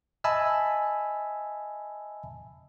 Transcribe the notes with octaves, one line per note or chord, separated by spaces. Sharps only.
D#5 E5 G#5 A5 B5 E6